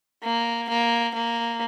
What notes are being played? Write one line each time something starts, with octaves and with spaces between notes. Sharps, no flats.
A#3
A#3
A#3